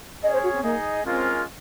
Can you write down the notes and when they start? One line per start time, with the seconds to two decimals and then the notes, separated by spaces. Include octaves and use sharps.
0.23 C#4 G#4 C#5 D#5
0.33 C5
0.43 F#4
0.54 C4
0.63 A#3 D#4 G#4 D#5
1.03 G#3 C4 C#4 F4 A#4